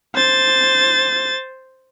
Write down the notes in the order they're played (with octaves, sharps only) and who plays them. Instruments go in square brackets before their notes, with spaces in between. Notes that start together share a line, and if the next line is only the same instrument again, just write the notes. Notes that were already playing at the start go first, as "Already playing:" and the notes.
[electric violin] C5 A6